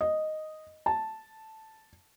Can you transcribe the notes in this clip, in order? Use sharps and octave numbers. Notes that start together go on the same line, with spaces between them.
D#5
A5